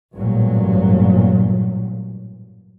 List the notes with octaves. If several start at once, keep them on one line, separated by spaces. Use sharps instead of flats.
A1 G2 A#2 F#3